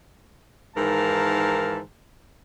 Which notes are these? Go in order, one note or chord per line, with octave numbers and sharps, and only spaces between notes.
G#2 D#3 E3 A#4 F5 A5